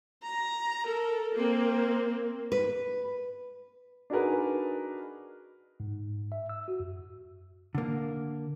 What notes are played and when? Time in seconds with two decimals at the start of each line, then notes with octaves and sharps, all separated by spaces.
0.23 A#5
0.86 A4 A#4
1.35 A#3 C4
2.52 B4
4.10 D4 D#4 F#4 G#4 A#4 B4
5.80 G#2
6.32 E5
6.49 E6
6.68 F#4
6.80 F#2
7.75 D3 A#3